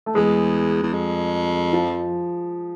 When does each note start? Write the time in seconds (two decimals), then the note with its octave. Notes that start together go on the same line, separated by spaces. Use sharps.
0.06 A3
0.15 E2 G#3
0.83 E2
0.93 F2
1.73 F3